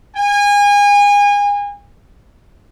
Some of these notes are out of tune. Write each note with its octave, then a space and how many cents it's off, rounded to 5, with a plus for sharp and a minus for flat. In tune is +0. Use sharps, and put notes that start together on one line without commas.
G#5 -30